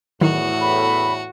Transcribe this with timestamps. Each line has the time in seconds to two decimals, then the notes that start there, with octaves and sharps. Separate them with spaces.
0.21 E2 A2 D#3 F#3 E4 F#4
0.60 B5